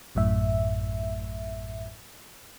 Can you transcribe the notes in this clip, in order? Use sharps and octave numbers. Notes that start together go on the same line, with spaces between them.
A1 F#2 A2 E5